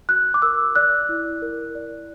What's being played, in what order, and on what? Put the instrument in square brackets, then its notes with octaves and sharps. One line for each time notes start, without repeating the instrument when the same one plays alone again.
[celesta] F#4 F#6
D6
A#4 E6
D5 F#6
E4
A#4
D5